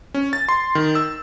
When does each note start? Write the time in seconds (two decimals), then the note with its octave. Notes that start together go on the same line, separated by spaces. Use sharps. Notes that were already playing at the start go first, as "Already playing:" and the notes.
0.14 C#4
0.33 A6
0.49 C6
0.75 D#3
0.95 E6